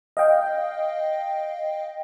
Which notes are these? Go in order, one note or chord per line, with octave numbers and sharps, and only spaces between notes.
D#5 F5 G5